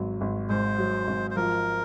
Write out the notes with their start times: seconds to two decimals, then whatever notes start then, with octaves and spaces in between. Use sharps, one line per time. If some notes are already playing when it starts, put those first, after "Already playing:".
Already playing: G#1 F#3
0.21 G#1
0.49 G#2 C5
0.79 F#3
1.07 G#1
1.31 C5
1.36 F3 A#4